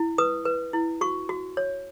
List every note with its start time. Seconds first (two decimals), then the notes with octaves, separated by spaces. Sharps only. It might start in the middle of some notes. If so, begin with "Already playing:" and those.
Already playing: E4
0.18 B4 D#6
0.45 B4
0.73 E4
1.01 F#4 C#6
1.29 F#4
1.57 C#5